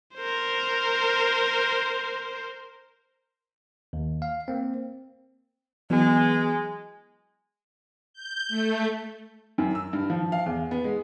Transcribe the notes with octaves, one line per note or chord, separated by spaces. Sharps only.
A#4 C5
D#2
F5
A#3 C4
E3 F#3 G#3 B3
G6
A3
F#2
E6
G2
F3
F5
E2
B3
G#3